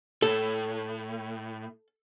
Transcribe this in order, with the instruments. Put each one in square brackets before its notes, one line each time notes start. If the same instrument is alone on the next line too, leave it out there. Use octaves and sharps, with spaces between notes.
[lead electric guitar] A2 [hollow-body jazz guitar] A4